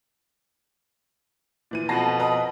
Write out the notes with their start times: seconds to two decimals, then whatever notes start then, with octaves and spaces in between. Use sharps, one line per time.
1.71 A#2 E3 D#7
1.89 F2 B2 A5 A#6 C7
2.20 B4 D#5 A#5